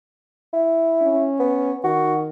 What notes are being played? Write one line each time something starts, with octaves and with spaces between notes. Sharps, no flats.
E4
C#4
B3
D#3 F#4